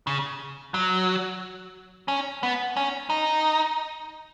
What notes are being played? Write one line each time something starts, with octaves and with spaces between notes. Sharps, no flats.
C#3
F#3
C#4
B3
C#4
D#4